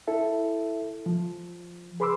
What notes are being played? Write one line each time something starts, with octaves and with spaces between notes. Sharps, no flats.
E4 A4 E5
F3
G#4 B4 B5 C6 D6 E6